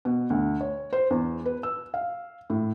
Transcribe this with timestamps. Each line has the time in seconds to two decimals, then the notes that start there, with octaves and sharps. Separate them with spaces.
0.05 B2
0.30 D2
0.61 C#5
0.93 C5
1.10 E2
1.46 B4
1.63 E6
1.94 F5
2.50 A2